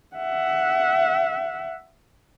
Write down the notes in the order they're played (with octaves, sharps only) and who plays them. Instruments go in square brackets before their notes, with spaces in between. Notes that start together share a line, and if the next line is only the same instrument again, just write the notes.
[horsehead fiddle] E5 F#5